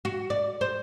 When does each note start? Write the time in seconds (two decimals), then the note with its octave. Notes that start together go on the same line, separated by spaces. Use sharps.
0.05 F#4
0.30 D5
0.61 C5